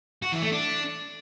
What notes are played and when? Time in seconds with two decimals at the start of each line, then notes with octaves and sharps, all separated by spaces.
0.22 F#4
0.32 E3
0.42 A3
0.52 D4